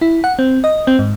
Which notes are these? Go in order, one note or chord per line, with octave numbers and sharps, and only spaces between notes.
E4
F#5
C4
D#5
C4
G#2